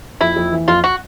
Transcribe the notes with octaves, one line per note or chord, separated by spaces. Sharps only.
F2 E4
F2
E3
F2 F4
F#4